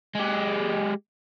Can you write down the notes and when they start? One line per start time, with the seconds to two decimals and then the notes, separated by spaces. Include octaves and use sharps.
0.15 G#3 G4